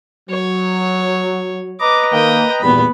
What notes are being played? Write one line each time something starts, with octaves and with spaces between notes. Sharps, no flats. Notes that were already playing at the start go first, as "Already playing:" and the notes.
F#3 C#5
B4 D#5 A#5 D6
D#3 A#3 G5 D#6
G#1 E2 A#2 G3 B3 B5